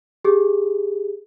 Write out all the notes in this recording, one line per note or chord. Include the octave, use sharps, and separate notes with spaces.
G4 G#4